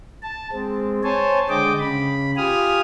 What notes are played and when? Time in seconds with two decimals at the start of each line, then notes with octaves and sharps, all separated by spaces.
0.22 A5
0.52 G#3 C4
1.03 C5 C#5 G#5 A5
1.50 D3 G#3 D#5 G5 D6
1.80 C#3 B5
2.37 F4 G4 G#5 D#6 F6